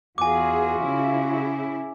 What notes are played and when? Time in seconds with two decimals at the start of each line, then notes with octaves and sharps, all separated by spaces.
0.18 E2 F4 F#4 G#4 G#5 D6
0.83 C#3 E4